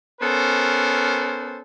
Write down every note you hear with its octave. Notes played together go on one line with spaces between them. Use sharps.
B3 C#4 A4 A#4 C5